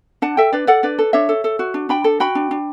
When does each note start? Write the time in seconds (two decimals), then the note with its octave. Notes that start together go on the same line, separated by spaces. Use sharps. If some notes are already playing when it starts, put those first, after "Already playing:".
0.22 D4 F#5 A5
0.37 A4 E5 G5
0.53 D4 B4 D5
0.67 A4 D5 F#5
0.83 D4 B4 D5
0.99 A4
1.13 D4 C#5 E5
1.29 A4
1.44 A4
1.59 F#4
1.74 D4
1.89 D4 G5 B5
2.04 A4
2.20 F#4 G5 B5
2.35 D4
2.51 D4